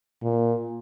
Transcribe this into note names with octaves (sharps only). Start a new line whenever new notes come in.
A#2